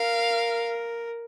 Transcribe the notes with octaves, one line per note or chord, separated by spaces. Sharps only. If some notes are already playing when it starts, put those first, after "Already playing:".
Already playing: A#4 F5